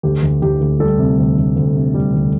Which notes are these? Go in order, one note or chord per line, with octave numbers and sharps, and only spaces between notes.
D2 G4
D2
D2 G4
D2
G3 A4
C3
D2
D2
D2
C3
G3
D2